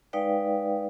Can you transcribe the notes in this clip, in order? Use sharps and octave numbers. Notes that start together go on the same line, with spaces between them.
G#3 D#4 B4 D5 F5 G5